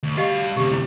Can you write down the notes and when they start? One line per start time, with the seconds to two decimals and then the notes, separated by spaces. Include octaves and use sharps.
0.03 D2
0.17 G3 F#4 G4 D#5 F5
0.57 D2 C3 G4
0.72 E4